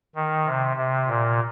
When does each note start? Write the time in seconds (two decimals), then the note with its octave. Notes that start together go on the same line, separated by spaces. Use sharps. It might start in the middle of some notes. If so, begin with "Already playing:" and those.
0.15 D#3
0.46 C3
0.77 C3
1.07 A#2